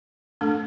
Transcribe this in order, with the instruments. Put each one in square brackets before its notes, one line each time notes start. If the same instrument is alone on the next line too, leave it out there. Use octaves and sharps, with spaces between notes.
[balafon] A3 D4 A4